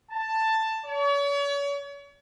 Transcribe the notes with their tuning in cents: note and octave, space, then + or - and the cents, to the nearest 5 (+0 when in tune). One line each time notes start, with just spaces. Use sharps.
A5 +10
C#5 +40